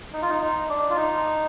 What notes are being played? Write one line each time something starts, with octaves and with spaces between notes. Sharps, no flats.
D#4
F4
D#4
D#4
D4
F4
D#4